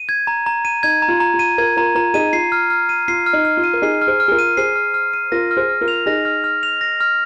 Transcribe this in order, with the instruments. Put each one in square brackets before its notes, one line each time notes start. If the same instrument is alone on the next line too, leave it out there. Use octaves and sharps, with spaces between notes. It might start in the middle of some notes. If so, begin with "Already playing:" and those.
Already playing: [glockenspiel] D#7
G#6
A#5
A#5
D#7
[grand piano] D#4 [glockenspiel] G#6
[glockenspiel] A#5
[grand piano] F4
[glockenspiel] A#5
[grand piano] F4
[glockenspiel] D#7
[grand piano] F4 A#4 [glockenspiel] G#6
[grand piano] F4 A#4 [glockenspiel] A#5
[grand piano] F4 A#4 [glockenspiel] A#5
[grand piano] D#4 G#4 [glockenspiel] D#7
[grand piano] F4 [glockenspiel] C7
[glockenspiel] F6
F6
D#7
[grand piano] F4 [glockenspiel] C7
[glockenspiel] F6
[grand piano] D#4
[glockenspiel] F6
[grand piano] F4
[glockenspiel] D#7
[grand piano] A#4
[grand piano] D#4 G#4 [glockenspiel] C7
[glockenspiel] F6
[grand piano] G#4 C5
[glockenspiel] F6
[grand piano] G#4
F4 A#4
[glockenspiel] D#7
[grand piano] G#4 C5 [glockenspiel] C7
[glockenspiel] F6
F6
D#7
[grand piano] F4 A#4 [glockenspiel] A#6
[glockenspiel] F6
[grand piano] G#4 C5
[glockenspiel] F6
[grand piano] F4 A#4
[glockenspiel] F7
[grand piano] D#4 G#4 [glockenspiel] A#6
[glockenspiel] F6
F6
F7
A#6
F6